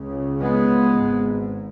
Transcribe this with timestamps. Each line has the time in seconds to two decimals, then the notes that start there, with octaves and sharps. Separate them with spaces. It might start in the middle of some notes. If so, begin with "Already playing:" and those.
Already playing: C#2 C#3
0.41 G#3 B3
0.92 G#1 G#2